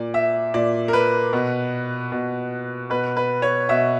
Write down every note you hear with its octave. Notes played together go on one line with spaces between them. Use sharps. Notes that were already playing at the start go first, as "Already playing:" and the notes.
Already playing: A#2 D5
E5
A#2 D5
A#4
B4
B2
B2
B2 B4
B4
C#5
B2 E5